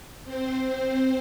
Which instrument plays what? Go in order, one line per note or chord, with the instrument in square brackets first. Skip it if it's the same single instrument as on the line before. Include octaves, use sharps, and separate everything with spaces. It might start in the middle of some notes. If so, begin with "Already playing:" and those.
[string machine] C4 C5